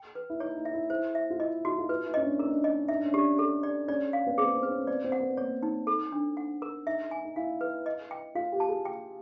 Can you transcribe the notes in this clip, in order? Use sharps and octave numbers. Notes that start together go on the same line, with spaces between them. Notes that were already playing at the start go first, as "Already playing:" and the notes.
Already playing: G5
B4
E4
D#4 C#5
D#4
E5
E4
E4 C5
E5
F4
E4 D#5
D#4 F#4
F4
E4 B4
E4
C#4 D#5
D4
D#4 A#4
D4
D#4
D#5
D#4 E5
D4
C#4
D4 G4
A4
D5
C#4 D5
F5
B3
C4 G#4
B3
C4
B4
C#4
C4 D5
C4
F#5
B3
A#3 C#5
D#4
A4
D4
F#5
A#4
D#4 E5
G#5
D#4
E4 F5
B4
D#5
G5
F4 F5
G4
A5
G#4
G5